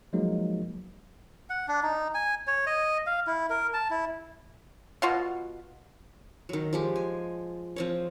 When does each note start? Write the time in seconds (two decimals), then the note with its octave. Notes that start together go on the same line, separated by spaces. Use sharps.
0.13 F3 F#3 G#3 A#3 D#4
1.50 F#5
1.68 D4
1.83 D#4
2.15 G#5
2.47 C#5
2.67 D#5
3.06 F5
3.27 E4
3.50 A#4
3.73 A5
3.90 E4
5.02 B2 F4 F#4
6.49 D#3 F#3
6.73 F3 G#3 G4
6.96 G#5
7.76 F3 C4 C#5